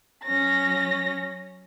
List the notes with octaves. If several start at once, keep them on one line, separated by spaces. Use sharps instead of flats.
F#3 C#4 A#6